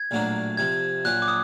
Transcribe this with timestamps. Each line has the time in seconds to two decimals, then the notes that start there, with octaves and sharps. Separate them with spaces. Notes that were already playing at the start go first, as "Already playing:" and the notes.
Already playing: G#6
0.11 A#1 A2 F#3 A#3 D4
0.57 C2 C3 F3 G#6
1.05 A#1 A#2 F#3 F#6
1.22 D6
1.28 D#6